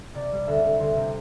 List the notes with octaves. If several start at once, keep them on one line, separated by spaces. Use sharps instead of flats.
C3 D5
G3
D2 E5
D2
D2 C5
C3